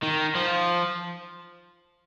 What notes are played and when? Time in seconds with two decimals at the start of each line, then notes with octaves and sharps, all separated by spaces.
0.02 D#3
0.35 F3